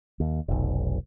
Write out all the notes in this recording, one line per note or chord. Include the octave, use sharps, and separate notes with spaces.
D#2
F1 B1